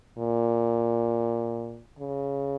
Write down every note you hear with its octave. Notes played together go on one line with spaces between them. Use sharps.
A#2
C#3